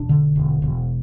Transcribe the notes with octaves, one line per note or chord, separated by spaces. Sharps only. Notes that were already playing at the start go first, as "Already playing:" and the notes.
Already playing: E1 D4
D3
E1
E1